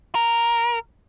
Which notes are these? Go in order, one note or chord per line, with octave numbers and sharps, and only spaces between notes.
A#4